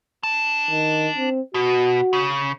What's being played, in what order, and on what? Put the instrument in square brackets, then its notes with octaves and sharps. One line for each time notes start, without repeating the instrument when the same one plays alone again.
[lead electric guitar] D4 A5
[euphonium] D#3
C4
[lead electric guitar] B2 [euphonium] F#4
[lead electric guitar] C#3